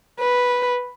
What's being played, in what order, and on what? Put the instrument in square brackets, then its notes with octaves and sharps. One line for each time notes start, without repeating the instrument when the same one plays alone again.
[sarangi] B4